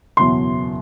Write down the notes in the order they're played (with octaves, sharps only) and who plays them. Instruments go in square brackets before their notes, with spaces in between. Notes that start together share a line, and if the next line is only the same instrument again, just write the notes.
[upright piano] F#1 E2 B2 F#3 C6